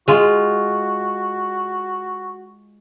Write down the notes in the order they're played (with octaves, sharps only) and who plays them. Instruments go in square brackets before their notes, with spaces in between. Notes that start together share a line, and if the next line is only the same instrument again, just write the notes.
[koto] G#3 F4 [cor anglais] F#4